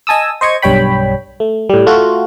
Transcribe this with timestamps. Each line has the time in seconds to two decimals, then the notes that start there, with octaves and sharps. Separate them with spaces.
0.07 D#5 G#5 A5 D#6 E6
0.41 C5 D#5 C#6 G#6
0.62 B1 G2 G3 C#5 G5 B5
1.40 A3
1.69 A2 G3
1.86 A3 F4 F#4